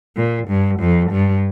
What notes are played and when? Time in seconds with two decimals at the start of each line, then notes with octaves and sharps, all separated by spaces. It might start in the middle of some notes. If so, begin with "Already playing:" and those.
0.17 A#2
0.48 G2
0.80 F2
1.12 G2